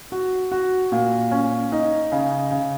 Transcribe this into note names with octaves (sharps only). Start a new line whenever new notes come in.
F#4
F#4
A#2
C#4
D#4
C#3
C#3